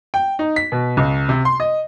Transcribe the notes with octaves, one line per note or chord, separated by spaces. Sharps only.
G5
D#4
B6
B2
C#2
C3
C6
D#5